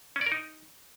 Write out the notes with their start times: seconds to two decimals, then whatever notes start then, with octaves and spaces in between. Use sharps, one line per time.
0.16 C#4
0.21 D5
0.26 A#4
0.32 D#4